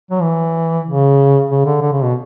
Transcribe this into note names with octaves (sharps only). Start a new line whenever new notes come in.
F#3
E3
C#3
C#3
D3
D3
C#3
B2